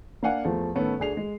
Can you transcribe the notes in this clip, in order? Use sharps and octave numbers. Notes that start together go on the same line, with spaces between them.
A#3 D4 F5 F#5 G#5
E2 F3 A3
A2 D#3 A3 B3 C#4 A4
D2 D4 G#4 C7 F7
G#3